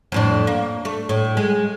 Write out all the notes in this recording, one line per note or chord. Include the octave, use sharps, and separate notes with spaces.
F2 A2 D4
A#3
A3
A2
G#3